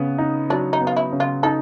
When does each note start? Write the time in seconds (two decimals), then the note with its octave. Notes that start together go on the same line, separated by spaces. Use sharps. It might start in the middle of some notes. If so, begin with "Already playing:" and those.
Already playing: C#3 B3
0.18 D#4
0.50 F#3 D4
0.73 D#4
0.81 B3
0.87 F4
0.96 E4
1.12 C#3
1.20 F4
1.43 D#4 A4